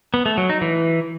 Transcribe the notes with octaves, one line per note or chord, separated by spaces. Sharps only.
B3
A3
F#3
D#4
E3